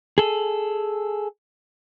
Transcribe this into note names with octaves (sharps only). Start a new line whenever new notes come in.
G#4 A4